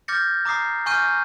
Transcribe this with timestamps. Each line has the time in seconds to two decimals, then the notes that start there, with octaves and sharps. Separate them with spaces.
0.08 D6 F6 G6 A6 A#6 C#7
0.45 A#5 D6 D#6 C7
0.86 G#5 C#6 F6 G6 D#7